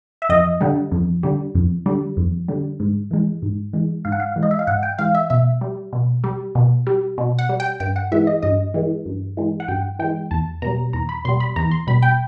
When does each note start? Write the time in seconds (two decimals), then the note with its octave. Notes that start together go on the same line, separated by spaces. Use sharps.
0.22 E5
0.29 F2 D#5
0.61 D3 G3
0.91 F2
1.23 D3 G3
1.55 F2
1.86 D3 G3
2.17 F2
2.48 D3 G3
2.80 G#2
3.11 E3 G#3
3.42 G#2
3.73 E3 G#3
4.05 G#2 F5
4.12 F#5
4.20 F5
4.36 E3 G#3
4.43 D#5
4.51 E5
4.59 F5
4.67 G#2 F#5
4.83 G5
4.98 E3 G#3 F5
5.15 E5
5.30 B2 E5
5.61 G3
5.93 B2
6.24 G3
6.55 B2
6.87 G3
7.18 B2
7.39 F#5
7.49 G3
7.60 G5
7.80 G2 G5
7.96 F#5
8.12 E3 G#3 E5
8.27 D#5
8.42 G2 D#5
8.74 E3 G#3
9.05 G2
9.37 E3 G#3
9.60 F#5
9.68 G2 G5
9.99 E3 G#3 G5
10.31 E2 A5
10.62 B2 G3 A#5
10.93 E2 A#5
11.09 B5
11.25 B2 C6
11.29 G3
11.40 B5
11.56 E2 A#5
11.71 C6
11.87 B2 G3 B5
12.02 G5